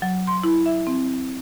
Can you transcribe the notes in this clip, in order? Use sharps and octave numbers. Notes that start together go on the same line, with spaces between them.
F#3
C6
E4
E5
C4